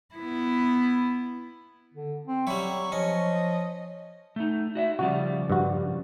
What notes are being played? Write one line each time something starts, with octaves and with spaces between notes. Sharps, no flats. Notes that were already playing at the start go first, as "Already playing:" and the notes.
B3 E4
D3
C4
F#3 G3 E4 C#6
F3 C#4 D#5
A3 D#4
F#4 D#5 E5
C#3 F3 G3 F#4
G2 F#4